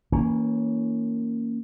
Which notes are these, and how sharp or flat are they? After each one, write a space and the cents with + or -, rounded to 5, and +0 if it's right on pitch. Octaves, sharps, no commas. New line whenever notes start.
E3 -35 A#3 -15 C#4 +0